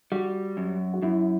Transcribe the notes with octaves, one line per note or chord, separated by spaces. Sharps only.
G3 F#4
F#2
F#4
F#2 E4